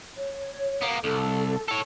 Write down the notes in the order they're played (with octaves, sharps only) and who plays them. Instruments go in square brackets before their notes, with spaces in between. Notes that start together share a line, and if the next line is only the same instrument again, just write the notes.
[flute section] C#5
[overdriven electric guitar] A#3 B3
[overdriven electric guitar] C2 [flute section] A4
[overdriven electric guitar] A4 C#5